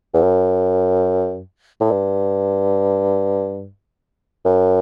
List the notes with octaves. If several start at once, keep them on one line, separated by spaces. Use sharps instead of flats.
E2
F#2
A2
G2
F#2